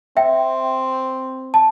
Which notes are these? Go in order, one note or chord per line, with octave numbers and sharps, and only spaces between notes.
C4 E5 G5
A5